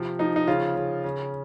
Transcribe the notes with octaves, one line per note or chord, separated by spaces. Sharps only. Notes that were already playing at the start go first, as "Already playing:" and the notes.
Already playing: C3 F3
F3 D#4
D#4
C#3 F4
C#3
C#3